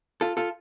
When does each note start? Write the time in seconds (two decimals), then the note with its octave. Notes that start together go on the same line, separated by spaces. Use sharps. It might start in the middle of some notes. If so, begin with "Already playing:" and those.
0.21 F4 A4
0.37 F4 A4